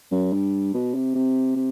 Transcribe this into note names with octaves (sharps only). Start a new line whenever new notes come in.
F#2
G2
B2
C3
C3
C3